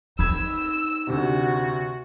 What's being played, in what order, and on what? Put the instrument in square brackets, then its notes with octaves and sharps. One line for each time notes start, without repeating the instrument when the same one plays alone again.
[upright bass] D#4 [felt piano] B5 G#6 [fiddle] E6
[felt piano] D2 C3 [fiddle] F#4